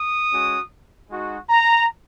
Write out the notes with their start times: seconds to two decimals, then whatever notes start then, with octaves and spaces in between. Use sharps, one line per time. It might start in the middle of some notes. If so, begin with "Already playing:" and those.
Already playing: D#6
0.31 G#3 C#4 F#4
1.11 G#3 D#4 F#4
1.50 A#5